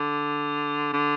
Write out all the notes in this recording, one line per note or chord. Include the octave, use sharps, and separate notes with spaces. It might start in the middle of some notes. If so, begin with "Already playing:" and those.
Already playing: D3
D3